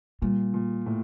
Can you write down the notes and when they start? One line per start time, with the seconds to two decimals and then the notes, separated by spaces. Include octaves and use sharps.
0.22 A#2 G3
0.54 A#2
0.86 A2